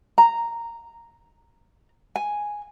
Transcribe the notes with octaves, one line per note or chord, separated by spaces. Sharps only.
A#5
G#5